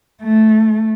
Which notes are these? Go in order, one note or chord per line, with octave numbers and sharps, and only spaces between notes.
A3